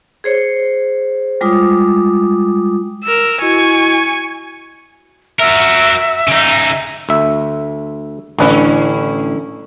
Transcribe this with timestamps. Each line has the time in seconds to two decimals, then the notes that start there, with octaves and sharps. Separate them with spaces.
0.24 G#4 C5 C#5
1.41 G3 G#3 F4 D6 D#6
3.04 A#4 E6
3.42 E4 F#4 D#5 G#5 C#6
5.39 F#4 A#4 E5
6.28 C#3 D#4
7.09 D2 E5
8.39 A1 D3 C#4 E4 B4